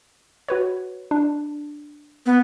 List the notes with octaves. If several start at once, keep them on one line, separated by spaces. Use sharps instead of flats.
F#4 B4 C#5
D4
B3